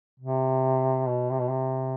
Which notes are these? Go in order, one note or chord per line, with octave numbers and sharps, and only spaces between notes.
C3
B2
C3
B2
C3